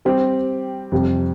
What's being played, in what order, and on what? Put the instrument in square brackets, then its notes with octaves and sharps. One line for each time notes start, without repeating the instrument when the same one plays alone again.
[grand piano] G3 C4 G4
F2 C3 G3